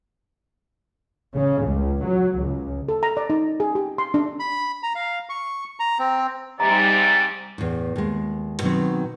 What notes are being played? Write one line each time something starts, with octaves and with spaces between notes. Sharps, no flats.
C#3
C#2
F#3
C#2
A4
A#5
D5
D#4
G#4
G4
C6
D4
B5
A#5
F5
C#6
A#5
C4
G#2 C3 G3 D#4 G4 D5 A#5
E2 A2
D#2 G#3
B2 D#3 F#3 C4